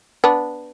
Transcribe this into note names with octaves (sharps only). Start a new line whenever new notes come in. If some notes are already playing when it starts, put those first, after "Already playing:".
B3 D4